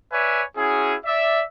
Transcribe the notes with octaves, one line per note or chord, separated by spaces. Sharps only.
B4 C#5 D5 E5 G#5
C#4 E4 F#4 G#4
D5 E5